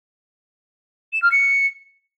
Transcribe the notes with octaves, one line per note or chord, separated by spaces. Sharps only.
E7
F6
C#7